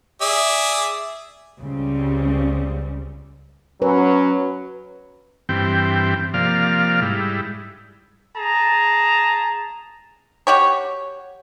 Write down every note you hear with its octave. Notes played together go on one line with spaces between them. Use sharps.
G#4 D5 E5
C#2 C#3 G3 C4
F#3 C#4 B4
G2 E3 C4 G5
C3 F3 A#3 D5 F5 F6
G#2 G3 E4
G#4 A5 A#5
F#4 G4 C#5